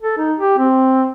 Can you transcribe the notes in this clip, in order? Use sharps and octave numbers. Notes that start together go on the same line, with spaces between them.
A4
D#4
G4
C4